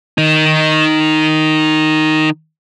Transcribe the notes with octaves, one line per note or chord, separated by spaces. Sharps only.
D#3 D#4